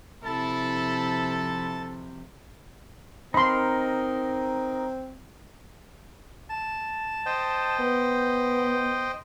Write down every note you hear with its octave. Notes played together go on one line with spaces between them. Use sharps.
C3 F3 E4 A4 A5
C4 D#4 A#4 B5 C6
A5
C5 D#5 G5
B3